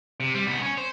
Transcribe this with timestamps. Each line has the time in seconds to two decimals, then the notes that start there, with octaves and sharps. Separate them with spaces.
0.20 C3
0.34 G3
0.47 C2 B3
0.63 C#4
0.78 C5